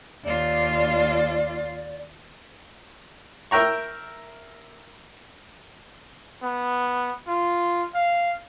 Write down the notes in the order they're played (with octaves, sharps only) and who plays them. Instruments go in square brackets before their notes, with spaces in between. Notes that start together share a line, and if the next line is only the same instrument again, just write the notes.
[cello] D#2 F4 [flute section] D5
[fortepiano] A#4 E5 G5 A#5 C#6
[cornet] B3
F4
F5